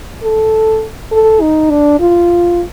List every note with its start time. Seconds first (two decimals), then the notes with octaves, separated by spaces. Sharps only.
0.23 A4
1.12 A4
1.41 D#4
1.70 D4
2.00 F4